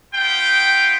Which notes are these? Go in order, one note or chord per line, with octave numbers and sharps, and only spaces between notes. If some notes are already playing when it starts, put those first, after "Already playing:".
B3 F4 G5